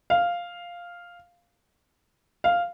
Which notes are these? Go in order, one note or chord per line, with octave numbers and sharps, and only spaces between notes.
F5
F5